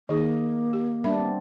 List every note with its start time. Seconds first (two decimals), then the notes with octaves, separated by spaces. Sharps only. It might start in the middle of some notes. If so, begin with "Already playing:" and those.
0.09 D#3 A#3 D#4 G#4 D#5
0.73 G4
1.04 G3 B3 D4 A#4 E5 B5
1.20 C4